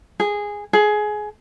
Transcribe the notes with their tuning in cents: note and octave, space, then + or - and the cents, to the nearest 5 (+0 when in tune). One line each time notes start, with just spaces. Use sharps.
G#4 -10
G#4 +20